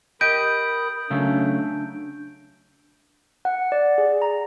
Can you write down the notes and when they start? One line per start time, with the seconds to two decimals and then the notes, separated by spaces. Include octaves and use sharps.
0.21 G4 A#4 D#5 B5 D#6 G6 D7
1.10 C#3 F#3 A3 D4
3.45 F#5
3.72 D5
3.98 G#4
4.22 A#5